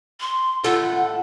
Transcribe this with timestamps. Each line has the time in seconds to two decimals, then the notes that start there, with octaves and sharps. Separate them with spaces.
0.20 C6
0.64 A2 F4 A4 F#5